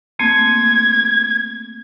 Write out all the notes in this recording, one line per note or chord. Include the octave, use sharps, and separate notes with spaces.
A3 A#3 C4 G#6